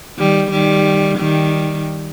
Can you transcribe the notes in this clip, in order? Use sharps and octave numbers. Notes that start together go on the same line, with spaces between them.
D#3 G3
D#3 G3
D#3 G3